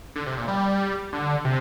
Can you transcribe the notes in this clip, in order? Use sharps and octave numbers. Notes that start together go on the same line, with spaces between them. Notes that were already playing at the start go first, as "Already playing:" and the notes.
D3
C3
A#2
G3
D3
C3